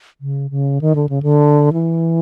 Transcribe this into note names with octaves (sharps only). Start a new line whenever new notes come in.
C#3
C#3
D#3
D3
C#3
D3
E3